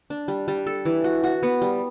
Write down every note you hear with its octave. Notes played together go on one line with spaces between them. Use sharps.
D4
G3
G3
A4
E3
F#4
F#4
B3
G3